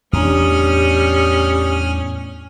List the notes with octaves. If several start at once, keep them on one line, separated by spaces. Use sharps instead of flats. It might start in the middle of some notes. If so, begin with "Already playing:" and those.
E2 A2 G3 C#4 D4 D#6 F6